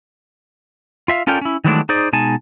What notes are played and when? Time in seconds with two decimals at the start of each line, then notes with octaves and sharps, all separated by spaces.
1.08 F4 E5 F5
1.27 C#4 F4 A4 A#4 D5 G5
1.41 C#4 E4
1.64 D#3 E3 F#3 G#3 A3 D4
1.89 D#4 G#4 C5 D5
2.13 B2 G#3 D#4 G#5 A5